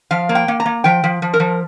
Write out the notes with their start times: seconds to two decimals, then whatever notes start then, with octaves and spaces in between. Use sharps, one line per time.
0.11 F3 F5
0.29 A#3
0.35 G5
0.48 A#3
0.60 A#5
0.66 A#3
0.84 F3 G5
1.04 F3
1.22 F3
1.33 A#4
1.40 F3